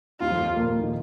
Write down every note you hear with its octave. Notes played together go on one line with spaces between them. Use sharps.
D#2 D#3 F4
F2 F3
A#2 A#3
A#2 A#3
D#3 D#4